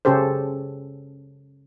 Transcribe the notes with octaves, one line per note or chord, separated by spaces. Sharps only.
C#3 C#4 G4 A4 C5